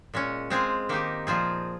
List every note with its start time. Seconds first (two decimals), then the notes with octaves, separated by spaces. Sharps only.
0.14 A#2 G#3 C#4
0.50 G#3 C4 F4 G#4
0.89 D#3 A#3 D#4 G4
1.27 A#2 F3 C4 F4 G#4